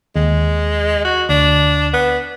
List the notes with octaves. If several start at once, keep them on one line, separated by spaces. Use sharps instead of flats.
D#2 G#3
F#4
D2 D4
B3